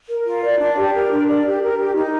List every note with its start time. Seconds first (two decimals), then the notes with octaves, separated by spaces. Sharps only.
0.10 A#4
0.26 F4
0.43 D5
0.60 D4
0.77 G4
0.94 A#4
1.11 D4
1.28 D5
1.45 G4
1.62 A#4
1.78 G4
1.95 D#4